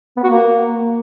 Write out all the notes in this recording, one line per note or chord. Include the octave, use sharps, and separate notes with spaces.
B3
F#4
A#3